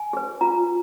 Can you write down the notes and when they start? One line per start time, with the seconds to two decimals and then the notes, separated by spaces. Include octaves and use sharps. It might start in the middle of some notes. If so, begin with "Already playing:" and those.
Already playing: G#5
0.13 G#4 B4
0.41 F4 A#5